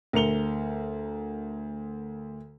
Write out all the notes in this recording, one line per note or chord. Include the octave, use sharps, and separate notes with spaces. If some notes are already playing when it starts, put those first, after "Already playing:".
D2 A#4 C#7 F7 G7